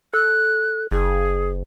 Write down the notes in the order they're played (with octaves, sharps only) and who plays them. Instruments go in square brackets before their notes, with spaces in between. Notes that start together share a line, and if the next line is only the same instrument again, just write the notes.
[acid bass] A4 [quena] F#6
[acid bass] F#1 [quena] G#4